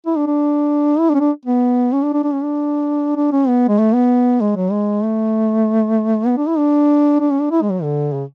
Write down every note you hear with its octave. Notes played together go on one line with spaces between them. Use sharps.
E4
D4
D4
E4
D4
C#4
D4
B3
C#4
D4
D4
D4
C#4
D4
D4
C#4
B3
G#3
A3
B3
G#3
F#3
G#3
A3
B3
D4
E4
D4
D4
C#4
D4
E4
G#3
F#3
D3
C#3